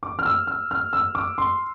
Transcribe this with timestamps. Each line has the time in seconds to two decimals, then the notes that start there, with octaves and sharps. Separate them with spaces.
0.03 D6
0.19 F6
0.26 E6
0.47 F6
0.71 F6
0.93 E6
1.15 D6
1.38 C6